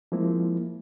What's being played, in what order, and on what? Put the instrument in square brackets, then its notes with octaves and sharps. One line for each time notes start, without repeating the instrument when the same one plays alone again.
[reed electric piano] F3 G#3 A#3 C4 E4